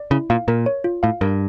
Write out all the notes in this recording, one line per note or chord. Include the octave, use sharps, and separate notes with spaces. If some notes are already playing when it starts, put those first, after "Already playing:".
Already playing: D5
C#3 E4
A#2 F5
A#2 A#4
C#5
F4
A2 F5
G2 A#4